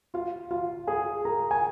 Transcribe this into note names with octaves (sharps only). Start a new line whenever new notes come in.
F4 F5
F4 F5
G#4 G#5
A#4 A#5
G#5